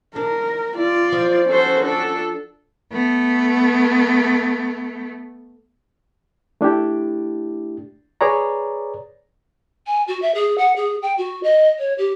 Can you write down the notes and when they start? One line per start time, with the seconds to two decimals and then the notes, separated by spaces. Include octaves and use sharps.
0.16 D4 A#4
0.78 F4 D5
1.12 F3
1.49 C#4 F#4 A4 C5
1.82 D4 A4
2.92 A3 B3
6.61 A3 D4 E4 G4
8.21 G#4 B4 C#5 D5 A#5
9.87 G#5
10.08 F#4
10.22 E5
10.35 G#4
10.58 F#5
10.76 G#4
11.02 G5
11.18 F#4
11.43 D#5
11.79 C#5
11.98 G4